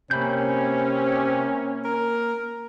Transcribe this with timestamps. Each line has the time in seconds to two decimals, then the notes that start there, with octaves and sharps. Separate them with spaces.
0.11 C3 A#3 C4 C#4 B5 G6
1.85 A#4